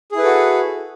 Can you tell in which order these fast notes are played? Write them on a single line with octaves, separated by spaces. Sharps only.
G#4 E4 B4 A4 F#4